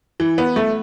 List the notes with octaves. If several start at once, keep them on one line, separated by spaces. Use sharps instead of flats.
E3
B3
A3